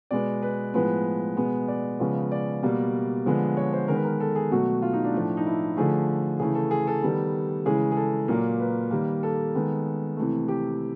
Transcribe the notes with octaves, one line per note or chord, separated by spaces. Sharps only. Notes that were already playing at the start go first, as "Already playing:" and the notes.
B2 G#3 B3 D5
B4
A2 F3 G#3 B3 B4
B2 G#3 B3
D5
C#3 F3 G#3 B3
D5
B2 G3 A#3
D3 F3 G#3 B3
C#5
C5
D#3 G#3 B3 A#4
B4
A#4
A4
G#4
B2 F#3 A3 F#4
F4
D#4
D4
A2 F3 A3
D#4
E4
D3 F3 A3 G#4
C#3 E3 A3 G#4
A4
G#4
A4
D#3 G3 B3
C#3 E3 G#3 G#4
G#4
A4
A#2 F#3 A#3 A#4
B4
D#3 G3 A#3
A4
D#3 G#3 B3
C3 E3 A3
G4